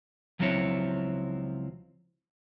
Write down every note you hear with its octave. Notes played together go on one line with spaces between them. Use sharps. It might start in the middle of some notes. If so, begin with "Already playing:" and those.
C#2 F3 F#3 C4 E4 C#5